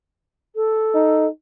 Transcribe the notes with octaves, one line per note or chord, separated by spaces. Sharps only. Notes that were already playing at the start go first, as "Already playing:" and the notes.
A4
D#4